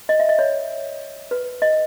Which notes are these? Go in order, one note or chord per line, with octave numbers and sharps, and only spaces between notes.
D#5
E5
D#5
C#5
B4
D#5